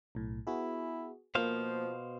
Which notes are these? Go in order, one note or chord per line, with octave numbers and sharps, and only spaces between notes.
B1 A2
B3 E4 F#4 G#4
B2 F3 A#3 F4 C5 F5